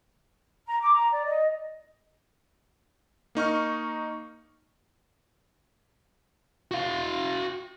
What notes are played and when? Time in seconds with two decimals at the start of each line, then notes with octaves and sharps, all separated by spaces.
0.67 A#5
0.81 D6
0.93 A#5
1.12 D5
1.25 D#5
3.35 A#3 D#4 C#6 F6
6.71 F#4 F5